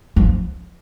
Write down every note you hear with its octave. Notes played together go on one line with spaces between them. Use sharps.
F3